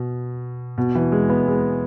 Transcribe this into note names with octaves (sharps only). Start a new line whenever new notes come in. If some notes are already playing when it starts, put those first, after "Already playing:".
Already playing: B2
B2
E3
G#3
B3
G#3